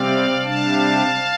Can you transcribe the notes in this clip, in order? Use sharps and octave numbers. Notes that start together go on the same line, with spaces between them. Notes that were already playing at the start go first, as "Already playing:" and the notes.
Already playing: C3 G3 C4 D5 F5
C3 G3 D4 F5 A5